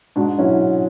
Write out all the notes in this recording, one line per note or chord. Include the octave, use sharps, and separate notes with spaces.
G#2 D4 F#4
F#3 C#4 E4